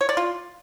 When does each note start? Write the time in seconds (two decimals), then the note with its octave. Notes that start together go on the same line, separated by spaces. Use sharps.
0.01 C#5
0.09 D5
0.17 F4